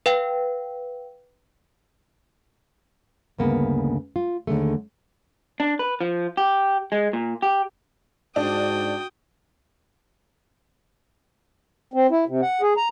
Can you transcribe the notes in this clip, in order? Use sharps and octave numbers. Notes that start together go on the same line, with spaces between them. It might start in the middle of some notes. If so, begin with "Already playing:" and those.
B4 F5 G5
D2 G2 C#3 A#3 B3
F4
D#2 D3 G#3 A3
D4
B4
F3
G4
G#3
A#2
G4
G#2 D4 F#4 G5 D#6
C4
E4
C3
F#5
G#4
A#5